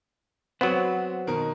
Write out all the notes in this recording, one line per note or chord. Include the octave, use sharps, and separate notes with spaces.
F#3 B3 C4 C5 F#5
B2 D#3 A#4